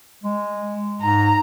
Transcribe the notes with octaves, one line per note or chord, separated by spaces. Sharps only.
G#3
G#2 A#5